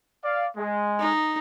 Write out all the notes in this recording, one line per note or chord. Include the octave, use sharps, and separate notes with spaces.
D5 F5
G#3
D#4